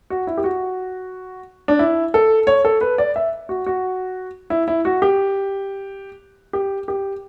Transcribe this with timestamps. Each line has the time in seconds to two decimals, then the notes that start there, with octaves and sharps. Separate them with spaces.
0.10 F#4
0.27 E4
0.37 G4
0.44 F#4
1.68 D4
1.79 E4
2.14 A4
2.47 C#5
2.65 A4
2.81 B4
2.98 D5
3.16 E5
3.49 F#4
3.66 F#4
4.50 E4
4.68 E4
4.85 F#4
5.02 G4
6.53 G4
6.88 G4